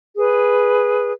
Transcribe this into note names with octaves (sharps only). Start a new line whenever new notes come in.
G#4 B4